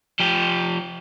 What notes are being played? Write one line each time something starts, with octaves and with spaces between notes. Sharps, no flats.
F3 G4